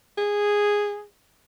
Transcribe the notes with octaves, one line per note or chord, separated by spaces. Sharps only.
G#4